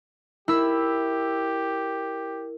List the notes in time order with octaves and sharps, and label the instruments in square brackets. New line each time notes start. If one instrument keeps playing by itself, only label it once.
[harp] E4 E6 [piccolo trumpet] G4 [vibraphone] A#4